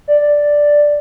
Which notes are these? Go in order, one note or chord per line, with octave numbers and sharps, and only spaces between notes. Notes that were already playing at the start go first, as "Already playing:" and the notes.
D5